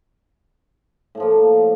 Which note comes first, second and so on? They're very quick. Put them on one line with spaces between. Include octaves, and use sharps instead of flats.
A2 A3 F3 A#3